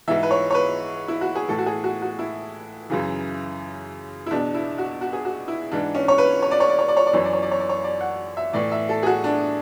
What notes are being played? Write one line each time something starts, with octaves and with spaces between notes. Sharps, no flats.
G#2 E3 E5
B4
C#5
C#5
B4
E4
F#4
G#4
A2 E3 A4
F#4
G#4
F#4
F#4
E4
F#2 C#3 E3
E4
E2 B2 D4
E4
F#4
F#4
G#4
F#4
E4
G#2 E3 D4
C#4
C#5
B4
C#5
D5
C#5
D5
C#5
D5
C#5
D5
F#2 E3 C#5
D5
C#5
D5
C#5
D5
C#5
D5
F#5
E5
A2 E3 D5
E5
A4
G#4
F#4
D4